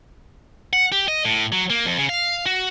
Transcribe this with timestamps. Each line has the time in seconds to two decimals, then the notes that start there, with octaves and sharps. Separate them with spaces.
0.73 F#5
0.92 G4
1.08 D#5
1.25 A2
1.52 F#3
1.70 A#3
1.85 F2
1.98 C#3
2.09 F5
2.46 F#4